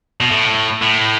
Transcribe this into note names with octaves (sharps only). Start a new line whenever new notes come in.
B2
A2
A2